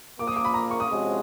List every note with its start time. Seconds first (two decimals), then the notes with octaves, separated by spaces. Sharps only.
0.19 A#2 F3 A#3 D6
0.27 D#6
0.36 D6
0.45 B5
0.54 A#5
0.71 C#6
0.80 D#6
0.88 C3 F3 G#3 C#4 F#4